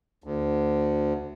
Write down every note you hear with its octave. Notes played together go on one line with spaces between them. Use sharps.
D2